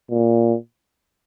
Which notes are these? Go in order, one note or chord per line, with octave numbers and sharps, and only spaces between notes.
A#2